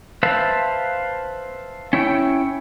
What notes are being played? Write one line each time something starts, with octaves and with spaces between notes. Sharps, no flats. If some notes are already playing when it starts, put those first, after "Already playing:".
B4 C5 E5 F5 A5
C#4 E4 C#5 G5